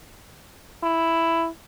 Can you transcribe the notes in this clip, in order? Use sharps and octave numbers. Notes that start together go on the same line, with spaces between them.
E4